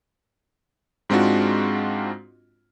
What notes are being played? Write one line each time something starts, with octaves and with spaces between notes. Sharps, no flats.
G#2 G#3 C4 D4 F4 F#4